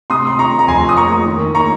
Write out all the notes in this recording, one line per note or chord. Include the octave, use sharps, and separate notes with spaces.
C3 C6 D#6
C6
C3 A#5 C#6
A#5
F2 G#5 C6
D#6
A#3 A#5 C#6
D#3
A#3 A#5 C#6